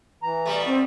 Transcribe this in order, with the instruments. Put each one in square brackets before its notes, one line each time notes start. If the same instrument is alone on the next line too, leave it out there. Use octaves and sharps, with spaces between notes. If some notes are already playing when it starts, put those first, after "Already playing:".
[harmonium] E3 A#5
[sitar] B2 G3 A3
[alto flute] C4